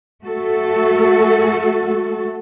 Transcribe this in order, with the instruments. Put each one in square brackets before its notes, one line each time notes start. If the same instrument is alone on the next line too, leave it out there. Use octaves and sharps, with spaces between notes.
[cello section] A3 F#4 A4